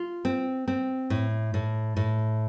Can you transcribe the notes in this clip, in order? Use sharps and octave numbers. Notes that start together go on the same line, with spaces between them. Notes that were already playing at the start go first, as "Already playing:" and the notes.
Already playing: F4
C4
C4
A2
A2
A2